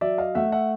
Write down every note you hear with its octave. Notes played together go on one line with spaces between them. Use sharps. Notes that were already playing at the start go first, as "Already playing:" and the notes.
F#3 D5 E5
D#5 F5
A3 E5 F#5
E5 F#5